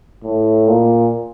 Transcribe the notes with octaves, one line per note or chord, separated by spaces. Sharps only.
A2
A#2